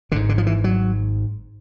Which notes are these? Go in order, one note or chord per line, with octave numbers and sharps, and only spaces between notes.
G#1 G#2 D3
D3
F3
E3
F#3